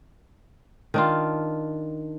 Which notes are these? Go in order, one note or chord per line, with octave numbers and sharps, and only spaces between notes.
D#3 D4 F4